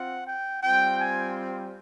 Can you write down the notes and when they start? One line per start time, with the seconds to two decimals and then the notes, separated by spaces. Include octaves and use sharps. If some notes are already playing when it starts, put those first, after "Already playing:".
Already playing: C4 F4 F#5
0.27 G5
0.63 G3 C4 F4 G5
1.00 G#5